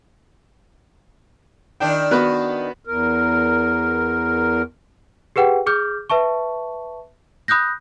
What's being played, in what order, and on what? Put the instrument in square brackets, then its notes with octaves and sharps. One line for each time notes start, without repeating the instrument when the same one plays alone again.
[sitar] D#3 D4 E4 [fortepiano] G5
[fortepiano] B3 F#4 B4
[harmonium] E2 A#4
[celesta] G4 G#4 B4 F#5 G5
G#4 D6 F6 G6
B4 E5 A5 C#6
B5 D#6 F#6 G6 A#6